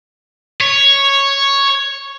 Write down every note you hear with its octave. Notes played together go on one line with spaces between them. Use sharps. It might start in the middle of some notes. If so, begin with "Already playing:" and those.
C#5